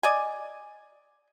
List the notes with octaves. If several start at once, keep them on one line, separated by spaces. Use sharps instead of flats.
D5 D#5 G#5